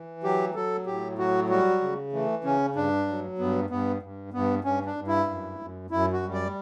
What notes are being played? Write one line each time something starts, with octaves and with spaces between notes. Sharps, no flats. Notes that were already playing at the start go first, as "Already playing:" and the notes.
Already playing: E3
F#3 G4
F#3 A4
A2 G4
F#3 F#4
G3 F#4
C#3
E3 A3
C#3 C#4
G2 D4
F#3
G2 B3
G2 B3
G2
G2 B3
G2 C#4
D4
G2
E4
F#2
F#2
F#2 E4
F#4
G3
D5